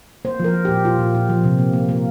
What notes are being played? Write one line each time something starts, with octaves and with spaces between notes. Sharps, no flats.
A#3 C5
F3 A#4
F3
G4
A#2
A#2 F4
A#2
A#2
F3
C3
A#3
A#3
A#3